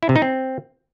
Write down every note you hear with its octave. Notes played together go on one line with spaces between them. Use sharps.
E4
C3
D#4
C4